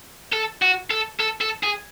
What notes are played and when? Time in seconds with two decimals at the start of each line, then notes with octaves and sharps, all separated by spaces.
0.32 A4
0.62 F#4
0.91 A4
1.20 A4
1.41 A4
1.63 G#4